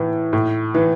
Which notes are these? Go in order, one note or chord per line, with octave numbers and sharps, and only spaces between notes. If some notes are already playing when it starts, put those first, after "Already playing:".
Already playing: A2 E3
A2
E3